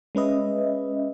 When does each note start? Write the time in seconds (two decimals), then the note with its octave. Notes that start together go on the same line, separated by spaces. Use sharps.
0.15 G#3 C#4 B4 D#5 E5